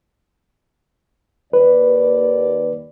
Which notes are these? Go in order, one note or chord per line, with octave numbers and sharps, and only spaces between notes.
D#2 B4 D5